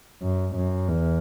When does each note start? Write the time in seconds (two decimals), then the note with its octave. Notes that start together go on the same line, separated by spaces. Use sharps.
0.22 F#2
0.56 F#2
0.88 E2